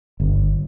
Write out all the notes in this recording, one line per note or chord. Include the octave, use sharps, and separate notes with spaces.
G1